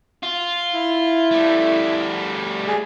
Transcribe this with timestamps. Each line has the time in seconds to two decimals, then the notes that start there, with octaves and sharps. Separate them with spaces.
0.23 F4
0.74 E4
1.31 G3 A3
2.68 G#4